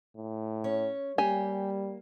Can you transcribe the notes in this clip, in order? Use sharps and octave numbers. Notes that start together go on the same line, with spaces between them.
A2
C#4 C#5
G3 A#3 G4 G#5